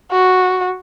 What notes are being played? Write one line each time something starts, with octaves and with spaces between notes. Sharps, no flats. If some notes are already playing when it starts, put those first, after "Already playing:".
F#4